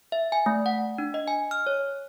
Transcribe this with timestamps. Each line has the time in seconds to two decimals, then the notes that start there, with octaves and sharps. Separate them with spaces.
0.12 E5
0.32 G#5
0.46 A3
0.66 F#5
0.98 D4
1.14 D#5
1.28 G#5
1.51 F6
1.67 C#5